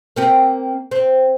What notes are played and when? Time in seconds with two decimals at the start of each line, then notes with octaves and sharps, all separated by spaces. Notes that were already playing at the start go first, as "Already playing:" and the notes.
0.16 A#3 C4 G4
0.91 C4